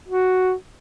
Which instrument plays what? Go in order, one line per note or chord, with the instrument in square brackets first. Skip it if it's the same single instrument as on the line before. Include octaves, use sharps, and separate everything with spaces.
[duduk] F#4